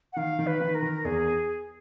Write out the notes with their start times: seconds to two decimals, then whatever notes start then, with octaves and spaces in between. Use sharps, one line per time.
0.13 F#5
0.17 D#3 F5
0.39 D#3
0.47 B4
0.61 D#3
0.75 A#4
0.82 D#3
1.05 E2 G#4